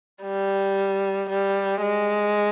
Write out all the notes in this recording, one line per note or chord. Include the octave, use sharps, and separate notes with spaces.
G3
G3
G#3